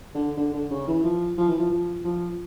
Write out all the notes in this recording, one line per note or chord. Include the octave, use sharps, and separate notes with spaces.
D3
D3
D3
C#3
E3
F3
F3
E3
F3
F3
F3